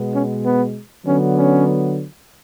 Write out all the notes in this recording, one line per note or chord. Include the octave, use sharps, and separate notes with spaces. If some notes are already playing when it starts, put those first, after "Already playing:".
Already playing: B2 G#3 B3
C#4
B3
D3 F#3 B3 C#4
C#4